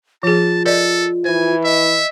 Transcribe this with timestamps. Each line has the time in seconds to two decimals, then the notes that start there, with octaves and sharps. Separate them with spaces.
0.23 F3 F4 G#4 A5
0.65 A4 A#4 D5 D#5
1.25 E3 C5 G#5
1.64 D#5 E5